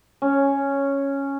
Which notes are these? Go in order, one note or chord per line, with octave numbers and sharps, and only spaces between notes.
C#4